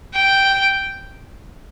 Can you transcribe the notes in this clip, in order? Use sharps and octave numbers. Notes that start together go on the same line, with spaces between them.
G5